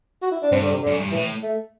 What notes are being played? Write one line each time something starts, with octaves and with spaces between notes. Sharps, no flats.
F#4
E4
D4
G2 C4
D3
C3
D3
F#2
G2
A2 E3
A3